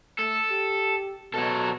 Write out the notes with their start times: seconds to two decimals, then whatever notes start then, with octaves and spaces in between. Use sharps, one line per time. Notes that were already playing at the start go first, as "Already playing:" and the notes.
0.19 A3 A4
0.51 G4
1.34 B2 F#3 A4